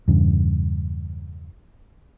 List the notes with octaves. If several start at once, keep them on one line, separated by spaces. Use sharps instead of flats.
E2 G2 C#3